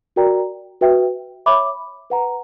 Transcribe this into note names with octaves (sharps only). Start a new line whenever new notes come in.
F#4 A#4 D5 G5 A#5
F#4 B4 E5 G5
C#5 E5 B5 D6
B4 F#5 A#5